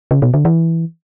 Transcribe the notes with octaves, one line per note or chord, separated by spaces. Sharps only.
C#3
B2
D3
E3